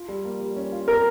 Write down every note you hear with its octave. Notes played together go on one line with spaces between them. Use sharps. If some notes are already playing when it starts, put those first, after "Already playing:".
Already playing: F4
G3
A#3
G3
C#4
F4
C4 A#4